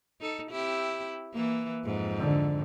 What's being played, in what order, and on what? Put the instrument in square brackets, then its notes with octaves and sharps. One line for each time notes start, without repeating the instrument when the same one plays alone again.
[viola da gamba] D#4 A4
C4 E4 G4
E3 A#3
F2 G#2
[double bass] D3